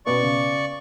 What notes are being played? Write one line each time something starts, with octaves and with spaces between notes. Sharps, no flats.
B2 B3 C#4 D5 C#6
C#3